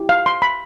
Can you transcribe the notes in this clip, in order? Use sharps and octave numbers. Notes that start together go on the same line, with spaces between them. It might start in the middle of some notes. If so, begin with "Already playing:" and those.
Already playing: E4 G4
F5
C6
B5